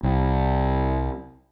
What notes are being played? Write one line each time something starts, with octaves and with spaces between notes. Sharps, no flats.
C2